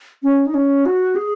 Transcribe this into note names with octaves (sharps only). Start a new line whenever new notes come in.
C#4
D#4
C#4
F#4
G#4